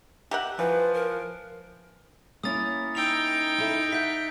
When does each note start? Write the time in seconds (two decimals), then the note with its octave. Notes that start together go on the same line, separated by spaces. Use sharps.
0.31 G4 A#4 E5 F#5
0.59 E3 F3 B4
0.94 A#4
2.43 A#3 C#4 E4 D#6 A6
2.95 D#4 G5 E6 F7
3.58 E4 A4 E5
3.92 E5 F#5 G6 B6